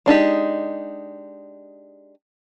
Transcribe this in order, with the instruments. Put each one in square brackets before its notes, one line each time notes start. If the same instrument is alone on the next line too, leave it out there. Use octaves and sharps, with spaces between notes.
[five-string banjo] G#3 D4 D#4 G4